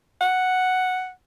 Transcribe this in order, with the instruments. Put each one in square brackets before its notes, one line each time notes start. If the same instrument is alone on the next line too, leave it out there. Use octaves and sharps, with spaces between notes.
[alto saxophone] F#5